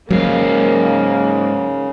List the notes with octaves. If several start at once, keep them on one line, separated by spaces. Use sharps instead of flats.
G#2 C#3 F#3 A#3 F5